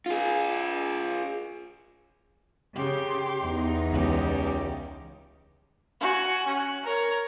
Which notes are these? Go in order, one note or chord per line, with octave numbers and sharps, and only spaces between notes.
F4 G#4
C#3 G4 C6
E2 D#4
C#2 C#4 G4
F#4 G#5
C#4 F#6
A#4 C#5